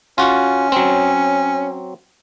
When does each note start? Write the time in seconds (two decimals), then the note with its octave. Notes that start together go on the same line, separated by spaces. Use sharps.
0.18 C#4 F4 F#4
0.72 F#3 C4